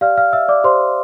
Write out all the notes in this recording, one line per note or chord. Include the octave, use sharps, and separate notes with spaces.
G4 D5 F5 F6
F5 F6
E5 E6
D5 D6
G4 C5 D5 C6